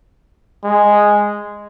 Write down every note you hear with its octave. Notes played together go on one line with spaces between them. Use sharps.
G#3